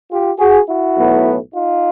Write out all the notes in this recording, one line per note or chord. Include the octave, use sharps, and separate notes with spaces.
F4 G4
F#4 G#4
E4 F#4
B1 A2 F#3 B3
D#4 F4